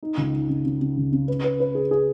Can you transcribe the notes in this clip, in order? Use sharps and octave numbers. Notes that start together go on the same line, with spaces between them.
D#4
C#2
D#4
C#3
C#3
C#3
C#2
C#3
B4
B4
B4
G#4
G#4